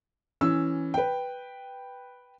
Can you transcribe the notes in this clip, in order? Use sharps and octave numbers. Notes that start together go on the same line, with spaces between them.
E3 C#4 E6
B4 G5